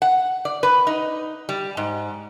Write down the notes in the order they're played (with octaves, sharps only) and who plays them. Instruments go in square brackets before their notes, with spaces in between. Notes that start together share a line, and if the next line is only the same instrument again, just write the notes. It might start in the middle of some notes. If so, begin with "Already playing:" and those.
[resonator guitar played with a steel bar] F#5
D5
B4
D#4
G3
G#2